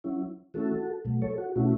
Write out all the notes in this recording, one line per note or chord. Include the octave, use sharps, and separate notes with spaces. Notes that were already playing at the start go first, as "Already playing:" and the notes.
F#3 C#4 E4
E3 A3 C#4 E4 F#4 A4
B2 F#3 A3
A4 C#5
F#4
B2 A3 C#4 E4 F#4